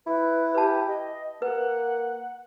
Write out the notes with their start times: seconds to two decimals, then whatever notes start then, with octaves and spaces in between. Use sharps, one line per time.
0.07 E4 B4
0.54 G4 B4 A5
0.88 D#5
1.42 A#3 B4 F#5